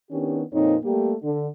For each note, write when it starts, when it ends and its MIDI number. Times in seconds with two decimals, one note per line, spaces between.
0.11 0.42 51
0.11 0.42 59
0.11 0.42 61
0.11 0.42 62
0.11 0.42 67
0.52 0.76 41
0.52 0.76 46
0.52 0.76 60
0.52 0.76 63
0.52 0.76 73
0.84 1.13 55
0.84 1.13 57
0.84 1.13 58
0.84 1.13 67
1.23 1.47 50